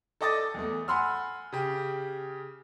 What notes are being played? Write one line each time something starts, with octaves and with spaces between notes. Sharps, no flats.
A4 D5 D#5 D6 D#6 A6
E2 A3
F#5 G#5 B5 C6 E6 F6
C#3 G4